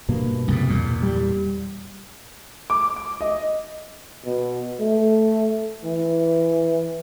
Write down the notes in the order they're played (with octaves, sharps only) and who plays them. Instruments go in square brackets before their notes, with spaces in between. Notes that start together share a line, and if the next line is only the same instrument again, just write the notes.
[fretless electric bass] G2 B2 A#3
[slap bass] C2 F2 G#2
E2 A#2
[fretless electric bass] G3
[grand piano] D6
D6
D#5
[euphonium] B2
A3
E3